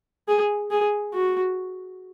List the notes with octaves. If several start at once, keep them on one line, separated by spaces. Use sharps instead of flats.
G#4
G#4
F#4